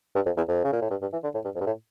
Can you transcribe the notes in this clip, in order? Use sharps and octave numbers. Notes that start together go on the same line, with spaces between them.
G2
F2
E2
F2
C#3
A#2
A2
G2
G2
E3
D3
A2
G2
F2
G2
A2